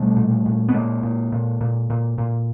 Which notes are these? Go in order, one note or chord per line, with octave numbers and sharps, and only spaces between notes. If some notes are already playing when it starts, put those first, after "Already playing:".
Already playing: B2 G3 A3
A#2
A#2
B3
A#2 G#3 A#3
A#2
A#2
A#2
A#2
A#2